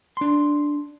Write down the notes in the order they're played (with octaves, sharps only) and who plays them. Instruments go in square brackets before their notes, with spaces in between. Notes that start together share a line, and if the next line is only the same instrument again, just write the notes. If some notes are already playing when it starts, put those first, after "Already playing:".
[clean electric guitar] D4 C6